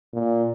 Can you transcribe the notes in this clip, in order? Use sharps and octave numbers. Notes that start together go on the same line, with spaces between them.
A#2